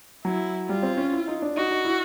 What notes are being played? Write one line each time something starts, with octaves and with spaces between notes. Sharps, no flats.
F#3 E4
G3 F4
C4
C#4
E4
D#4
D4
D#4 F#4
D#4
E4